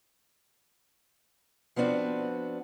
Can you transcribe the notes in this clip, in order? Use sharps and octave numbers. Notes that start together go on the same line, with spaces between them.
F3 B3 C4 D4 F#4